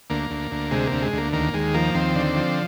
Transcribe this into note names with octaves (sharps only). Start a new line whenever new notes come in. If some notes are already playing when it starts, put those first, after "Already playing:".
D2 A#3
D2
D2
C3 G#3
A#3
D2
G#3
D2 A#3
D#2 A#3
D#2 G#3
F3 A#3
D#2 C4
D3
F3